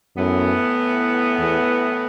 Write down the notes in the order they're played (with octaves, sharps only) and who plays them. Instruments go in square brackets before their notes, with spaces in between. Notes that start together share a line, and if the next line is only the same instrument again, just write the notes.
[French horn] F#2 [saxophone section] A2 E3 B3
[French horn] E2